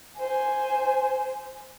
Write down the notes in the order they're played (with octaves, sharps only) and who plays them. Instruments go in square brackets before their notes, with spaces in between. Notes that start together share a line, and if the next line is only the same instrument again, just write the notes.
[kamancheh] C5 G#5